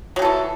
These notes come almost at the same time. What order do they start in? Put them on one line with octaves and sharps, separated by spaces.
F#3 G4 A4 E3